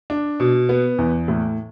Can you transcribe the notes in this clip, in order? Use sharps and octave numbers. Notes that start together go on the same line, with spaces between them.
D4
B2
B3
E2
A2